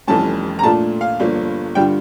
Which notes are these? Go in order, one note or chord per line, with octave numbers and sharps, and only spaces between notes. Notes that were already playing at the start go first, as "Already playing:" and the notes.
F1 F2 E3 G3 C#4 A5
A#5
A#2 A3 D4 F4 A5
F5
G1 G2 F3 A#3 D4
G2 D3 G3 D4 F4 G5